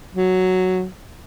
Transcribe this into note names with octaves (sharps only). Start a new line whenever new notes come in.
F#3